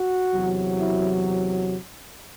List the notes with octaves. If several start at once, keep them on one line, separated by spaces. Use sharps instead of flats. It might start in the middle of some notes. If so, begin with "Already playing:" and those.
Already playing: F#4
E2 C3 F#3
E4